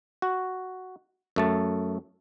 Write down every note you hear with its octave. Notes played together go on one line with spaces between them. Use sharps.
F#4
F#2 A3 A5